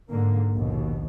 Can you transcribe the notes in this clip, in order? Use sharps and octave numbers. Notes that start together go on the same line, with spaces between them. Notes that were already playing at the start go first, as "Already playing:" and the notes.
G#2 D3 A#3
A#1 D#2 B2